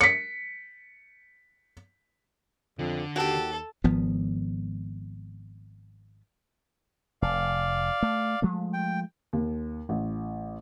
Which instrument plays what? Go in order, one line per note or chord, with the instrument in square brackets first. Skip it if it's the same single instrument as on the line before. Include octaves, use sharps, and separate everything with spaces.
[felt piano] B6 C#7
[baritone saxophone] F2 [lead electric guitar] D3
[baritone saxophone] D#2 [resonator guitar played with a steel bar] F#4 G4 [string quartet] A4
[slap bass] G#1 F3 B3
[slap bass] F1 [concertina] D5 F5
[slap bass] A3
F3 G#3 A3
[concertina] G5
[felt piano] D#2
A1